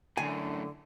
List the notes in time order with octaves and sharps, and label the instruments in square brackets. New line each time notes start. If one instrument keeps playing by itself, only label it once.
[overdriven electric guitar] F#2 A2 [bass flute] D3 [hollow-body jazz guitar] G#5